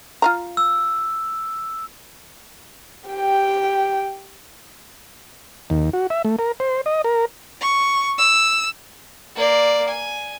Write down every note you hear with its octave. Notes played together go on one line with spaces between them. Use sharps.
F4 F5 A#5
E6
G4 G5
D#2
F#4
E5
A3
A#4
C5
D#5
A#4
C#6
E6
A#3 D5
G#5